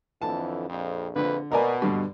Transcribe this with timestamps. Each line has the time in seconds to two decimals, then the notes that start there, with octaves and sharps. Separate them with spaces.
0.22 F2 D3 E3 A5
0.69 A#1 F2
1.16 A#1 F2 D3 B4
1.52 B2 A#4 D5 G#5
1.82 G2 D3